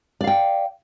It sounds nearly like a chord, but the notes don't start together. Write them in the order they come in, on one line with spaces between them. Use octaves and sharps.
D5 F5 G5